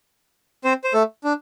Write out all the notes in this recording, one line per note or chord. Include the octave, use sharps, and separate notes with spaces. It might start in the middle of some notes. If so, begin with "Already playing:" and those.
C4 C5
C5
A3 A4
D4